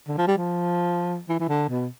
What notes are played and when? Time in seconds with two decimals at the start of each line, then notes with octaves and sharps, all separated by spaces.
0.08 D3
0.18 F3
0.27 G3
0.38 F3
1.29 E3
1.40 E3
1.49 D3
1.69 B2